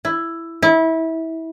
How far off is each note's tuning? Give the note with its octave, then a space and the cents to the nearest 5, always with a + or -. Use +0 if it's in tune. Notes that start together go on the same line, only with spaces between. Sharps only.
E4 +10
E4 -25